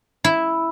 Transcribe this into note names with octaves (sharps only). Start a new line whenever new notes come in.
E4